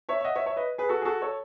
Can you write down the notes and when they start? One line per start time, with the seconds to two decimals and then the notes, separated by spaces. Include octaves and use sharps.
0.09 C#5 E5
0.20 E5
0.24 D#5 F#5
0.35 C#5 E5
0.46 C#5 E5
0.56 B4 D#5
0.78 G#4 B4
0.89 F#4 A4
1.02 G#4
1.05 F#4 A4
1.22 A4 C#5